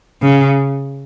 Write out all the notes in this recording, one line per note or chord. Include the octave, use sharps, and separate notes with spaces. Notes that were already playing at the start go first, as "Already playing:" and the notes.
C#3